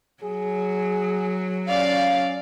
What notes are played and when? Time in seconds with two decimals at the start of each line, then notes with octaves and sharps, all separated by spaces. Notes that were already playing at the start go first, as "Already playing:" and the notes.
0.23 F#3 G#4
1.69 C#4 D5 F5